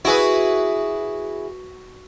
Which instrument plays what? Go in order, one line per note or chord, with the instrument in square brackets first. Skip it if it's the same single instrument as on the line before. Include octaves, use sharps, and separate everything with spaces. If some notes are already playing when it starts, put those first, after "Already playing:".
[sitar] E4 G#4 [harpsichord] F#4 B4